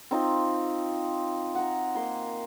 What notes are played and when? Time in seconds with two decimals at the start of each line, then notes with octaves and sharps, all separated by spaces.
0.11 C4 D#4 F4
1.55 F#5 A#5
1.95 A#3 C6